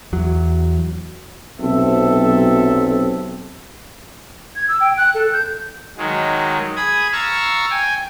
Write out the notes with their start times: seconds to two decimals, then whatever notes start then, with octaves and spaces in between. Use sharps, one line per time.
0.13 E2 F#3
1.59 B1 C3 C4 A4 E5
4.56 G#6
4.68 E6
4.80 G5
4.97 F#6
5.14 A4
5.33 G6
5.98 D#3 F#3 G#3
6.76 G#4 B5 D#6 G#6
7.13 F5 A5 A#5 C#6 E6 F6
7.70 G5 G#5